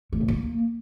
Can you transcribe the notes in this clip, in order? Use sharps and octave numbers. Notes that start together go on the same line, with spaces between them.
A3
B2
A#3